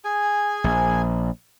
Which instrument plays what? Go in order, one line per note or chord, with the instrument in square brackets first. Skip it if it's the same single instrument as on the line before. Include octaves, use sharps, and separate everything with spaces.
[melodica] G#4 G#5
[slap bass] A#1